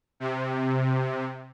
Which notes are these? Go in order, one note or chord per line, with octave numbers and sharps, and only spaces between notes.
C3